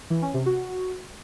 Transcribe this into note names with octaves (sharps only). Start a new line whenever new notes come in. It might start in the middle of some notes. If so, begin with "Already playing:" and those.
E3
C#4
C3
F#4